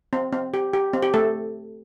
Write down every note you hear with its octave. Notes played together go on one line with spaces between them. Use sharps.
C4
C4
G4
G4
C4
G4
A3 A4